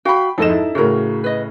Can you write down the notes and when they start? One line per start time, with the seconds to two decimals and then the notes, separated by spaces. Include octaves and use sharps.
0.05 F#4 F5 G5 B5
0.38 F2 G#2 D#4 A4 D#5 E7
0.50 E4
0.75 A2 C#3 F#4 A#4
1.24 B4 D#5